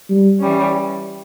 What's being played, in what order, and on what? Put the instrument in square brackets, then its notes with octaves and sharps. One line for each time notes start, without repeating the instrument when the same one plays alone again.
[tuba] G3
[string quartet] E3 G3 C#4